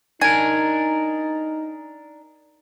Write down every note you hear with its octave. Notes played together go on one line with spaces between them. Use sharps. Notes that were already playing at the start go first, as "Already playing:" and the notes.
D4 D#4 A#4 G#5